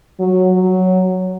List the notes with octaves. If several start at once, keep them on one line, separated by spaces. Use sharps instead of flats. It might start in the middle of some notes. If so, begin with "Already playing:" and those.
F#3
F#3